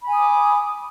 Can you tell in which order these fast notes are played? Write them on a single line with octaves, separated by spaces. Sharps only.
B5 G#5 D#6 D6